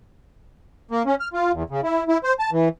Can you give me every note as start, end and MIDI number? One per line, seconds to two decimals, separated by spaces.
0.91 1.03 58
1.06 1.15 61
1.20 1.28 89
1.33 1.52 65
1.53 1.63 40
1.70 1.81 49
1.84 2.04 64
2.08 2.18 64
2.24 2.33 72
2.39 2.50 81
2.52 2.69 52